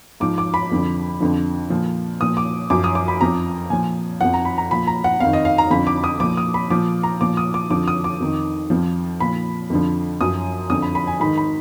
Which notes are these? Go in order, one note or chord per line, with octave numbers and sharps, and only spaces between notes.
G#2 F3 D6
D6
B5
F2 D3 F3
F2 D3 F3
A#2 F3
A#2 F3 D#6
D6
F#2 F3 D6
D#6
D6
B5
F2 F3 A#5
A#2 F3 G#5
F2 F3 F#5
A#5
B5
A#5
A#2 F3 B5
A#5
F#5
F2 D#3 F5
D#5
F5
A#5
F2 D3 F3 B5
D6
D#6
A#2 F3 D6
D#6
B5
A#2 F3 D6
A#5
A#2 F3 D6
D#6
D6
F2 D3 F3 D6
D#6
D6
F2 D#3
F2 F3
A#2 F3 B5
F2 D3 F3
F#2 F3 D#6
F2 D3 F3 D#6
B5
B5
G#5
G#2 D#3 B5
B5